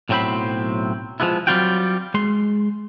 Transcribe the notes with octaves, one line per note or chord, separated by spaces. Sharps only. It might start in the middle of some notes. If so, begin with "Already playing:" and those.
B1 A2 F#3 C4 C5 B5
F3 F#3 G#3 B3 E4
F#3 G3 C4 F4 F#4 G5
G#3 C6